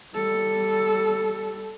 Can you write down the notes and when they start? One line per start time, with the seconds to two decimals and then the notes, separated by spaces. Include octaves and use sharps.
0.14 G3 A4